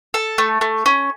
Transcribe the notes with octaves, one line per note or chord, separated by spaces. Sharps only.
A4
A3
A3
C#4